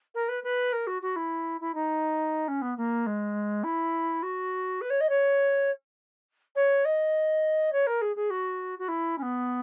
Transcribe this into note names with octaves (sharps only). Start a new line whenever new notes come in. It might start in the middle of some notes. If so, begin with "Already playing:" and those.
A#4
B4
B4
A#4
F#4
F#4
E4
E4
D#4
C#4
B3
A#3
G#3
E4
F#4
B4
C#5
D#5
C#5
C#5
D#5
C#5
A#4
G#4
G#4
F#4
F#4
E4
C#4
B3